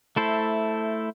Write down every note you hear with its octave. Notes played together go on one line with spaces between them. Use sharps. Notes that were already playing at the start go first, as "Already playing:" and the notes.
A3 E4 A4 C5